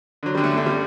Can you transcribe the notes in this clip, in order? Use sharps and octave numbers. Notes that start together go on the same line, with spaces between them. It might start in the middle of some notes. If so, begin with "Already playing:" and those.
D3 F#3
D3 G3
A3
F#2
A3
C#3 G3